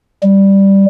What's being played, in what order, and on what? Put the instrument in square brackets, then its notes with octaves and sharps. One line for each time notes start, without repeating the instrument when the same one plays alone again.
[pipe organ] G3